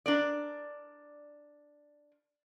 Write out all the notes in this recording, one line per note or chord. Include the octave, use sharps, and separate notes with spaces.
D4 A#4 D5